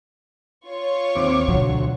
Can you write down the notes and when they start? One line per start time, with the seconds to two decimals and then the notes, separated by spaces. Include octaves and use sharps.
0.67 F4 C#5 C#6
1.16 D#2 C4 D6
1.48 D2 B2 E3 F#3